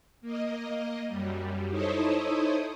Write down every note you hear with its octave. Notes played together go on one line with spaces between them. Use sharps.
A#3 D#5
F#2 G3
D#4 E4 A4 C5 C#5 D#6